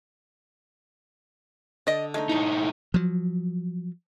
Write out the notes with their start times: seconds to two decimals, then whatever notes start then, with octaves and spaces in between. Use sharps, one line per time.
1.87 D3 D5 D#5
2.14 G#3 A3 D4 D#4
2.29 A2 D#4 E4 C#6
2.94 F3 F#3